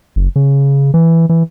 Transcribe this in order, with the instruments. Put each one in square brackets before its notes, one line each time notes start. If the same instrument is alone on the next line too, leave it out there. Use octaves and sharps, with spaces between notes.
[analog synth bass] F#1
C#3
E3
E3